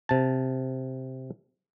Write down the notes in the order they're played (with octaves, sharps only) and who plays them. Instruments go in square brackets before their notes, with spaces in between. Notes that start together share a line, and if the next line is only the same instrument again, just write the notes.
[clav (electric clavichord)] C3 A5